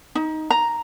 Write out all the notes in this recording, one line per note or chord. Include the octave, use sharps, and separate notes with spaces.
D#4
A#5